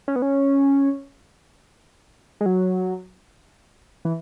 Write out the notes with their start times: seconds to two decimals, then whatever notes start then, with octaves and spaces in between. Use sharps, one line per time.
0.08 C#4
0.16 B3
0.22 C#4
2.41 G#3
2.46 F#3
4.05 E3